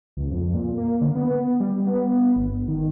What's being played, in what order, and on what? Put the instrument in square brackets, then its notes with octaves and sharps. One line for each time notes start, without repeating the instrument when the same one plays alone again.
[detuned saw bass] C#2
F2
A#2
A#3
D3
B3
G3
B3
G1
D#3